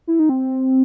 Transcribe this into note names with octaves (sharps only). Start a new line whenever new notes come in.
E4
D#4
C4